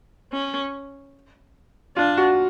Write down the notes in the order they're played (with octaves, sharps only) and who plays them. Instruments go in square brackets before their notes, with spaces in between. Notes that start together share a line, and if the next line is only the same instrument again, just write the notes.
[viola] C#4
[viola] D4 [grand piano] F4
[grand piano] F#4